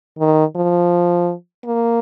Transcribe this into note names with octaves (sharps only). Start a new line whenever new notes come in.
D#3
F3
A#3